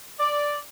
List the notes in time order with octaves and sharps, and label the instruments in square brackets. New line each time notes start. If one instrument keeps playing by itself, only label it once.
[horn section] D5